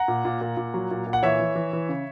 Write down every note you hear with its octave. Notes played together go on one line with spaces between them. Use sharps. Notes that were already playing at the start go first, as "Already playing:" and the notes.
Already playing: F#5 A#5
A#2
A#2
A#2
A#2
F#3
A#2
A#2
F#5
E3 C#5 E5
E3
E3
E3
C#3